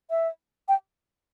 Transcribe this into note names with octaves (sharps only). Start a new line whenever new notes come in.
E5
G5